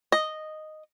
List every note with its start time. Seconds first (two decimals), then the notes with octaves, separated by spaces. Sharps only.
0.12 D#5